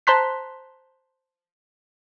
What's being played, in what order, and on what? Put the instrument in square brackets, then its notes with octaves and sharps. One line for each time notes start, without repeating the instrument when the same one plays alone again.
[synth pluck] C5 A5 A#5 C6 F#6 B6